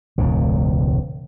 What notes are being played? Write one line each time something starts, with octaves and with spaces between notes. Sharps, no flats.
E1 C#2 G#2 C#3